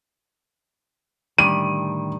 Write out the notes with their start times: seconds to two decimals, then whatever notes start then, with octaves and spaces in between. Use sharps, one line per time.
1.38 A2 D3 D#3 G3 D#7